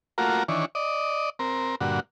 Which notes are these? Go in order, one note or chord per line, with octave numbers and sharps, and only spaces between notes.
A3 A#3 F4 F#4 A#4
D#3 E3 D4 C#5
D5 D#5
C4 A#4
G2 A#2 D3 F#4